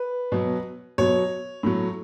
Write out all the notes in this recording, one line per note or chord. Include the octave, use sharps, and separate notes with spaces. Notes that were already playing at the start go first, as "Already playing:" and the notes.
Already playing: B4
B2 F#3
B2 F#3 C#5
A2 F#3